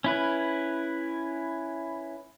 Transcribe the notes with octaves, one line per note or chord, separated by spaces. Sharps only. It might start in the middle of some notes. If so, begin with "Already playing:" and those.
C#4 E4 B4